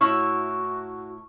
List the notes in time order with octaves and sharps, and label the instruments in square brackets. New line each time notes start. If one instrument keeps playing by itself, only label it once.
[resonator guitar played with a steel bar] A2 E4 C#5 [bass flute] F#4 [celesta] C#6 F6